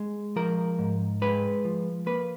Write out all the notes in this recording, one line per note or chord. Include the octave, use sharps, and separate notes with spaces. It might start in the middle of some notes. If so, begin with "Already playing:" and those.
Already playing: G#3
F3 A#4
G#2
G#3 B4
F3
A#3 B4